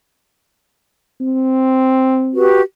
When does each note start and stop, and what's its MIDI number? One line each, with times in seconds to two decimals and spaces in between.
1.21 2.48 60
2.34 2.60 66
2.34 2.60 67
2.34 2.60 71